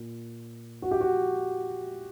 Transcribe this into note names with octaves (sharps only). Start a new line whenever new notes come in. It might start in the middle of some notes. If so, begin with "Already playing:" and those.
Already playing: A#2
F#4
G4
F#4